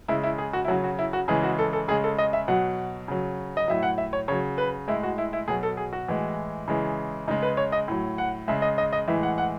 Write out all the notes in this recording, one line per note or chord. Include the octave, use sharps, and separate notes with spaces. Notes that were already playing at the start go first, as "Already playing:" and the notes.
C#3 G#3 E4
E4
G#4
F#4
E4
C#3 F#3 F#4
F#4
E4
F#4
C#3 E3 G#3 G#4
F#4
A4
A4
C#3 G#3 G#4
A4
D#5
E5
B2 F#3 F#5
C#3 F#3
D#5
A2 F#3 E5
F#5
E5
C#5
C#3 F#3 C#5
B4
A2 G#3 E4
F#4
E4
E4
B2 F#3 G#4
A4
G#4
F#4
A2 E3 G#3
C#3 E3 G#3
C#3 G#3 D#4
B4
C#5
D#5
A2 F#3
F#5
C#3 G#3 E5
D#5
D#5
D#5
A2 E3 G#3 E5
F#5
F#5